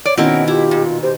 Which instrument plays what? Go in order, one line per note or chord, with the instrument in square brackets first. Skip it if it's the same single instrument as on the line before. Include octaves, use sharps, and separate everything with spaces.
[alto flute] C#5 [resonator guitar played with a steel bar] D5
[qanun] B2 D#3 A#4 [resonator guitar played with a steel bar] C4 E4 [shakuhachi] C#4 [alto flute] F#5
[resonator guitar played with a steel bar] E4 [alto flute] F4 [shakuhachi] G4
[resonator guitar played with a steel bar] A#2
[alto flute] G4 [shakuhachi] C5